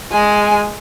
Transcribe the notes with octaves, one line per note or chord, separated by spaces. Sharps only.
G#3 G#5